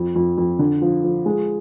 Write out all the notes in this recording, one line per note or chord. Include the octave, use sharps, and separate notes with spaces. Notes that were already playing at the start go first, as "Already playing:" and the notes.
Already playing: F2
F2
F2
D3
F3
F3
G#3